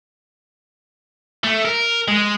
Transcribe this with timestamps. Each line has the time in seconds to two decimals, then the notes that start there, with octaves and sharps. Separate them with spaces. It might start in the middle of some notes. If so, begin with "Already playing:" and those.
1.44 A3
1.65 A#4
2.08 G#3